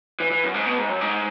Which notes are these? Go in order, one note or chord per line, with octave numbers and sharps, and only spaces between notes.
E3
E3
F#2
G#2
B2
G#2
F#2
G#2